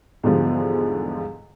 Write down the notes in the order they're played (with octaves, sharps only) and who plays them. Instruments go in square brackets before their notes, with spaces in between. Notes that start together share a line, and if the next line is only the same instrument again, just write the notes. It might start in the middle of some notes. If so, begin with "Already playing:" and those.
[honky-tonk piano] E2 G#2 D3 F3 G3